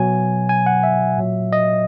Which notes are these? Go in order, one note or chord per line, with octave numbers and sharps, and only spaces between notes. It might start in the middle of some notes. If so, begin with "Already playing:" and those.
Already playing: B2 F#3 G#5
G#5
F#5
E5
A#2 F#3
D#5